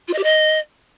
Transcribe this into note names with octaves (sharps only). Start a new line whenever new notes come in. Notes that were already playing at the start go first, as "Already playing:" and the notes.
F4
D#5
G4
D#5